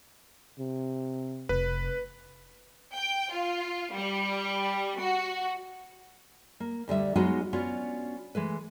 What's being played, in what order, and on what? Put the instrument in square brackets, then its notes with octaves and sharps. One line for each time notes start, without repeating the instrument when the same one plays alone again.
[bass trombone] C3
[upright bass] F1 [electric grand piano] B4
[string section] G5
F4
G3
F#4
[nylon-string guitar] A#3
D2 D3 G3 E5
F#3 G#3 B3 D#4 F4 F#4
B3 C#4 D4 F4 F#4
E3 G#3 A3 B4